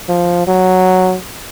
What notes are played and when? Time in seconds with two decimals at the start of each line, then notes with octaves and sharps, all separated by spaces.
0.09 F3
0.47 F#3